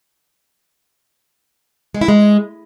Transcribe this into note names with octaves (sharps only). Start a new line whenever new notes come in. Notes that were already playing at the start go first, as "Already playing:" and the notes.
G#3
E4
G#3